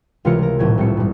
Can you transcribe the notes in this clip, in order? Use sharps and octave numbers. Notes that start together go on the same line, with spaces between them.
C#2 C3 E3 F4 A#4 C#7
F4 A#4
D#1 A#1 A2 G#6
C2 C4 A4 C#7
G2 G3